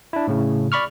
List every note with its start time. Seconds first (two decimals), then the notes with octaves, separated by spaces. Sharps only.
0.13 D4 E4
0.28 A2 C#3
0.72 D5 B5 C#6 F6